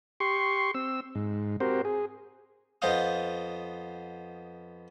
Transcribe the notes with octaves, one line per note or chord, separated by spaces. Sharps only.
G4 C6 C#6
C4 E6
G#2
C4 F#4 G4 A#4 C5
G#4
F2 B3 C5 D#5 F5 D#6